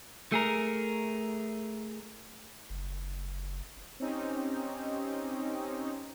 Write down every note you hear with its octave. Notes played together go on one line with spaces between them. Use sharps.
A3 G#4 A#4
F#1
C4 C#4 D#4 G4